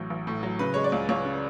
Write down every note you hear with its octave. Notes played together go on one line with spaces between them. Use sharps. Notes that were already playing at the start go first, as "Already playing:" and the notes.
Already playing: A1 A2 F#3
A1
A2
F#3
C#3 B4
G#3 C#5
D5
C#2
C#2 C#5
C#3